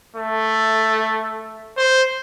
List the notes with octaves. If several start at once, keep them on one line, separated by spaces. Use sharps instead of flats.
A3
C5